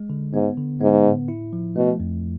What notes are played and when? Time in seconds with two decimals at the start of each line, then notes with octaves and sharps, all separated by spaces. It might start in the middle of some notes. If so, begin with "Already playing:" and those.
Already playing: G#3
0.10 D3
0.33 G#2 B3
0.57 D3
0.81 G#2 B3
1.05 A2
1.28 E4
1.53 F3
1.76 B2 A3
2.00 F2